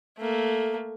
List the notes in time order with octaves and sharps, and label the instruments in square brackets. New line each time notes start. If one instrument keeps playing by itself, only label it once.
[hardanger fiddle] A3 A#3